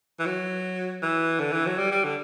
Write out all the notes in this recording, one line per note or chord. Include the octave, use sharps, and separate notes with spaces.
E3
F#3
E3
D3
E3
F#3
G3
G3
D3